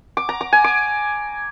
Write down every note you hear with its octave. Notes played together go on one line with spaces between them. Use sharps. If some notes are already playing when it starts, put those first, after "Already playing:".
D6
A#5
D6
G#5
D6